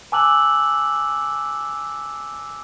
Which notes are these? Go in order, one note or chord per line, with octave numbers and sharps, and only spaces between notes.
G#5 A5 D6 E6 F#6 F#7